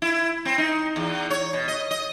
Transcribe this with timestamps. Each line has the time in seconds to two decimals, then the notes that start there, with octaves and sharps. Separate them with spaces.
0.02 E4
0.45 C4
0.58 D#4
0.96 E2
1.30 C#5
1.53 B2
1.68 D#5
1.91 D#5